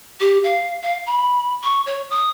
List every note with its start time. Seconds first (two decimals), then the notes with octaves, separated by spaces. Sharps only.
0.20 G4
0.44 F5
0.83 F5
1.07 B5
1.64 C#6
1.86 C#5
2.10 D#6